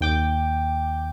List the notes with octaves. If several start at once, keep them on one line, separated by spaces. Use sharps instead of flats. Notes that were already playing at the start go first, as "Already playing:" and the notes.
D#2 G5 D6